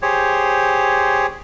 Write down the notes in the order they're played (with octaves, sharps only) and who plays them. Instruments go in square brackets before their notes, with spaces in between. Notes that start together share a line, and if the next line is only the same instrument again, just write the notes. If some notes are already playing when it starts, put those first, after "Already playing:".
[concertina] G4 G#4 C5 C#5